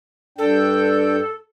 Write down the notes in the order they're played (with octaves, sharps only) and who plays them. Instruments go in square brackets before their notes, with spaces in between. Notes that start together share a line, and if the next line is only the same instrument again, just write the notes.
[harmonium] G2 D4 G5 [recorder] A4